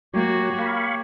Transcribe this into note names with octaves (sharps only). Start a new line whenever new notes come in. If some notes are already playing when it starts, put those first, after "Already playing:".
F#3 A#3 F#4 G4 C#5
A#3 F5 B5 C#6